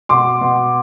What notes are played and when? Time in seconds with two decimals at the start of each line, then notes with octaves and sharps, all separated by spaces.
0.09 B2 C6 D6
0.41 B2